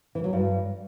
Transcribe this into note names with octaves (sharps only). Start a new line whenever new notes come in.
E3
F#3
G2